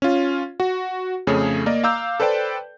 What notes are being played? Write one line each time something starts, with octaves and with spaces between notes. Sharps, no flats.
C#4 F4
F#4
F2 C#3 A3 G#4 C#5
A#3 A#4 D5 D#5
F5 A#5 D6 E6 G6
A4 B4 C5 D5 G5 A5